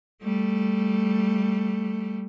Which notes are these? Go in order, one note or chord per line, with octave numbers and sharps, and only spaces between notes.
G3 A3